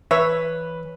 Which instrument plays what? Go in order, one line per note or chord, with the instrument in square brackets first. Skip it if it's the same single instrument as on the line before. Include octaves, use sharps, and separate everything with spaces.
[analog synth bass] E3 [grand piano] B4 [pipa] C#5 [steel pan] E5